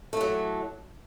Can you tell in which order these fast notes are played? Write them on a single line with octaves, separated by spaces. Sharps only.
A3 E3 F#3